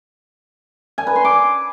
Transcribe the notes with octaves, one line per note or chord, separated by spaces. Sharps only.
G#5
B4
C6
D6